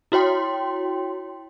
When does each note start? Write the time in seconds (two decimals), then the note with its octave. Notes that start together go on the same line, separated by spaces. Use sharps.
0.12 E4 F#4 C#5 G5 C6